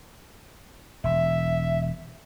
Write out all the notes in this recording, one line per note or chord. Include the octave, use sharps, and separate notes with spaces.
E1 E5